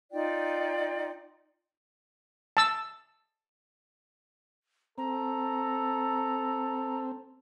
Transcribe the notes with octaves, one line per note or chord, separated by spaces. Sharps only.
D#4 F4 D5 G5
A5 E6
C4 A4 A#5